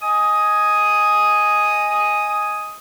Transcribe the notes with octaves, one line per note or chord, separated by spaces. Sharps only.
D#5 G#5 D#6